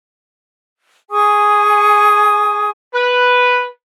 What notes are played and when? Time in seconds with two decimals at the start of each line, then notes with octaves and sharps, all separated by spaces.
1.11 G#4 G#5 C#6 D#6
2.94 B4